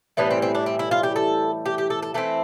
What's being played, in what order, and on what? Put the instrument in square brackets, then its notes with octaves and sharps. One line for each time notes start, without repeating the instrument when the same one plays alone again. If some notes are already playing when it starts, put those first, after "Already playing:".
[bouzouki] A2 E3 G3 B3 D4
C4
C4
D4
C4
E4
F4
G4
A4
G4
G4
A4
A4
E3 A3 C4 A4